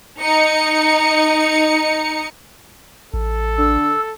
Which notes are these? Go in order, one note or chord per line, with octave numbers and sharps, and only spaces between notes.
D#4 C#7
A1 A4
D3 E6